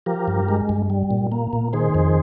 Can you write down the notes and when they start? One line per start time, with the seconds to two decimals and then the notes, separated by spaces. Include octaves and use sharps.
0.06 F3 G4 A#4
0.28 G2
0.48 G#3
0.69 G2
0.90 G3
1.11 A#2
1.32 A#3
1.53 A#2
1.73 D#3 G#4 C5
1.94 F2